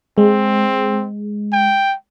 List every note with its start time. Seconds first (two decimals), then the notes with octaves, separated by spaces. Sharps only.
0.18 G#3 C4
1.53 G5